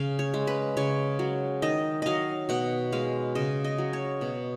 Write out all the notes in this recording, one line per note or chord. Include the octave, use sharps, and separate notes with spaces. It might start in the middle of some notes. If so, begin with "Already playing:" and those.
Already playing: C#3 F5
C#5
G#3
B4
C#3 C#5
F#3
D#3 D#5
F#3 D#5 F5
B2 F#5
G#3 F5
C#3 D#5
D#5
F#3
C#5
B2